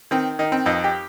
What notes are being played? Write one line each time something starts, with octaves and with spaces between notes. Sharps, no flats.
D#3 C4
D#3 D#4
C4
F2 D#4
G4